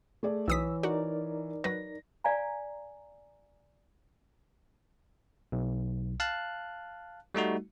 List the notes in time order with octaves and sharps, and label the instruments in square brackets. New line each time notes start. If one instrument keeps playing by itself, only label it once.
[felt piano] A3 G#4 D5
[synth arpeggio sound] B1 D#6 B6 [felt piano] E3 C#5 [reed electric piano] E6
[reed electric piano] D#4 A#4 D5 [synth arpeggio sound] F#4
[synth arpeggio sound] F#3 B4 [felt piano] A#6
[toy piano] D5 F5 G#5 A#5
[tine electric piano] B1
F5 A5 F#6
G3 A3 D#4 F#4